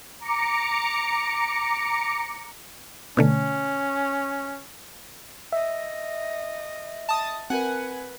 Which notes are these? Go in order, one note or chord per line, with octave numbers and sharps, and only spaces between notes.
A#5 D6 C#7
B2 D3 A3 C#4
D#5 E5
A5 D#6
C4 A#4 B4 F#5 G#5